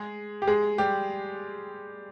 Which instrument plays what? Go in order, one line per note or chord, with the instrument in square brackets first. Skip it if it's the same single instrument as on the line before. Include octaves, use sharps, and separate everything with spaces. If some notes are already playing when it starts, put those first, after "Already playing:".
Already playing: [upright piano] G#3 G#4
G4
G#3 G#4
G3 G4